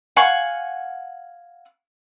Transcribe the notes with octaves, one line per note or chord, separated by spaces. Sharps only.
F5 F#5 G#5 C#6